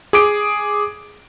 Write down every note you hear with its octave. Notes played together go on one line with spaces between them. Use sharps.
G#4 D6 D7